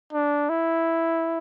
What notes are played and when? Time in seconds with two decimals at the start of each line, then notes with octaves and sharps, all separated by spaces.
0.13 D4
0.50 E4